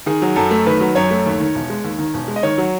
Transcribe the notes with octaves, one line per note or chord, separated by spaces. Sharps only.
D#3 G#4
F#3
F#2 A4
A3
D#3 B4
F#3
F#2 C#5
A3
D#2
D#3
E1
G#3
D#2
D#3
E1
G#3
D#5
D#3 C#5
F#3